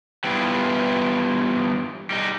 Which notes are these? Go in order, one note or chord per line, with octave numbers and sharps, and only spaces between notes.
E3 G3 B3 D4 E4 F4
G3 D#4